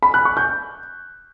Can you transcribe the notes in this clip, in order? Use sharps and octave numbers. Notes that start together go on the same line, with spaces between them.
B5
F#6
C#6
G6